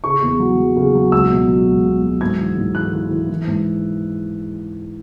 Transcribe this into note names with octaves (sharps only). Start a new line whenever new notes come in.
C#3 C#6
E2
F#3
F#3
C#3
F#3
C#2 E6
B2
F#3
C#2
B2
F#3
G#2 G#6
E3
G#2
E3 F#6
E3
E3
E3
G#2